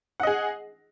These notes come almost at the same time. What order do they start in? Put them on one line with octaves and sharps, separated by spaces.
F#5 D#5 G#4